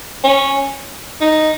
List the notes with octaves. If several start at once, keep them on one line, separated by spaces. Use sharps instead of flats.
C#4
D#4